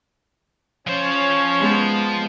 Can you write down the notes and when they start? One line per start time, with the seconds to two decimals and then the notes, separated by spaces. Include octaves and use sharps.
0.87 F3 C#4 C5 C#5
1.59 G#3 B3